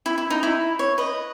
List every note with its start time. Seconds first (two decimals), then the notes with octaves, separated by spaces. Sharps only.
0.06 E4
0.18 E4
0.30 D#4
0.43 E4
0.79 C#5
0.98 B4 D#5